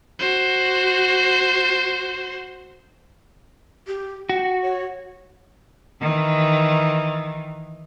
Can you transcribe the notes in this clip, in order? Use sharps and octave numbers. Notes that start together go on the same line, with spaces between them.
F#4 C5
G4
F#4 G5
C#5
D#3 E3